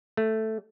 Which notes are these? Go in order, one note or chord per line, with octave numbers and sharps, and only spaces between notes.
A3